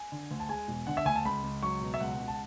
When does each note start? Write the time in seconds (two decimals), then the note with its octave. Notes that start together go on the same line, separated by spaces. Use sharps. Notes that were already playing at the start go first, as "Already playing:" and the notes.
Already playing: G#5
0.12 D3
0.31 D2
0.40 A5
0.49 G#3 G#5
0.68 E1
0.87 D3 F#5
0.97 E5
1.06 D2 G#5
1.16 A5
1.25 C#2 B5
1.44 C#2
1.63 F#3 C#6
1.81 B2
1.94 E5
2.00 C#2 F#5
2.19 C#2
2.28 A5